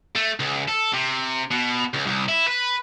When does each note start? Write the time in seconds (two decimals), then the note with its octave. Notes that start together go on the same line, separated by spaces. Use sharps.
0.16 A3
0.39 C#2
0.68 A4
0.93 C3
1.51 B2
1.93 C#2
2.07 C2
2.29 E4
2.48 B4